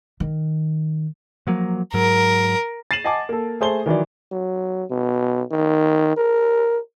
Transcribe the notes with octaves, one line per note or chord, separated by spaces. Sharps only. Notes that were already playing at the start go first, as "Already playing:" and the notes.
D#3
F3 F#3 A#3
G#2 F#3 A#4
A6 C7 D#7 E7 F#7
D#5 F#5 G#5 A5 D6
A#3 A4
A3 G#4 C5 A5 G7
D#3 E3 F#3 D5
F#3
B2
D#3
A#4